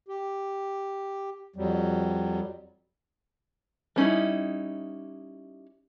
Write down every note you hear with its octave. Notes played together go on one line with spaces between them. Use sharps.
G4
F2 F#3 G3
G3 C#4 D#4 E4